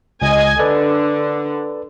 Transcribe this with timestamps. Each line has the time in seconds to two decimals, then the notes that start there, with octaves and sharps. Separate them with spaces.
0.22 C#2 D#5 G#5
0.59 D3 A4 B4 D5